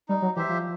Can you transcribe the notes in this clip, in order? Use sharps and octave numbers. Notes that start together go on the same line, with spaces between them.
G3 D#4
F#3
E3 G4 C5 E5
F3